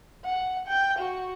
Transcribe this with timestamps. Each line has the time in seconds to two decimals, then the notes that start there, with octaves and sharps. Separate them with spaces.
0.25 F#5
0.67 G5
0.98 F#4